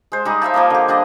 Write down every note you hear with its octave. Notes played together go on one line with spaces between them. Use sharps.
G#3 C5
G3 D#4 G#4
C5 E5 F5 A5
F3 A#3 A#4 D#5
D3 G4
G3 D4 D5 D#5